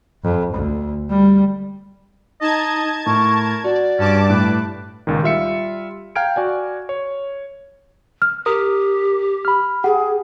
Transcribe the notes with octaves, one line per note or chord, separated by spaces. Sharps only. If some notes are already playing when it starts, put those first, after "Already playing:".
F2
D2
G3
D#4 D#5 A5 G#6
A2 A#4 C#6
F#4 D5
G2 C#4 A5 D6
A2 B4
C#2 A#2 D#3
G3 F4 E5 C#7
F5 G5 A#5 F6 G#6 D7
F#4 D5 G#5
C#5
F6
G4 A#4 D#6
B5 F6
G4 G#4 F#5